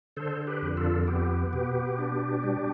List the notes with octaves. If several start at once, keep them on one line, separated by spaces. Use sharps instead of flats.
D3 A4 C5
G4 B4
F2
F4 A4
B3 G4
B2 G4
D4
G3